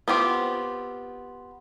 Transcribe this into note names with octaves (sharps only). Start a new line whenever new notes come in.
B3 C4 F4 G4